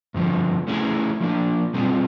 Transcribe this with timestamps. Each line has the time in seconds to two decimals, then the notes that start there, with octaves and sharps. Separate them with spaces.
0.14 G2 D3 F3
0.68 A3 C#4 E4 G#4
1.20 F3 A#3 D4
1.74 B2 G3 C4 F4 G#4